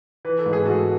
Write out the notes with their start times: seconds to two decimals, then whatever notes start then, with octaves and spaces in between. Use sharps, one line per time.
0.25 E3 B4
0.39 A4
0.46 G#2
0.53 G#4
0.65 G#2 F#4 A4